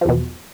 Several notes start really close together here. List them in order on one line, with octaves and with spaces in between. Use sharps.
F3 E2 B2